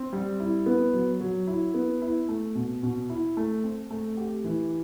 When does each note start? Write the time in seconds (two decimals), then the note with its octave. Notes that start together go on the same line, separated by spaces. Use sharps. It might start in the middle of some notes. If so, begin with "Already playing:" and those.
Already playing: C4
0.13 G3
0.40 E4
0.66 B3
0.94 F#3
1.21 F#3
1.47 E4
1.74 B3
2.02 E4
2.29 A3
2.55 B2
2.83 B2
3.10 E4
3.37 A3
3.64 C4
3.90 A3
4.17 G4
4.44 E3